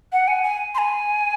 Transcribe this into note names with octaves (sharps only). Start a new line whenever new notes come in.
F#5
G#5
G#5
C6
G#5